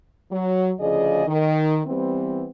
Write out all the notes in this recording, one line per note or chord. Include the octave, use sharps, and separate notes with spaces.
F#3
D2 C#3 F3 G#4 D5 D#5
D#3
E3 G3 B3 C4